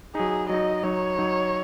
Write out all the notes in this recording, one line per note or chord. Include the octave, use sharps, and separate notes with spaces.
F#3 D#4 G#4
F#3 D#4 D#5
F#3 D#4 C#5
F#3 D#4